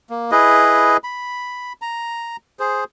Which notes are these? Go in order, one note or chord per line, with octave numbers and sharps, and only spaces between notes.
A#3
E4 G#4 B4 D#5
B5
A#5
G#4 C5